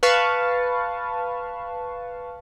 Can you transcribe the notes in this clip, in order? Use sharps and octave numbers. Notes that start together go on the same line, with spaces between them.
B4 F5 A5 C#6